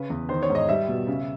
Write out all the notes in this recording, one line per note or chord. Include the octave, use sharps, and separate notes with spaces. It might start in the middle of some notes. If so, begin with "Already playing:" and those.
Already playing: C#3 B4
E2
D#3 C5
C#5
G#2
D#5
G3 E5
B2
C#3